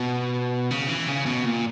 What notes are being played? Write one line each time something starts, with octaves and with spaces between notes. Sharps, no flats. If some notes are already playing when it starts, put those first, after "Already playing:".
Already playing: B2
C#3
E3
C#3
B2
A#2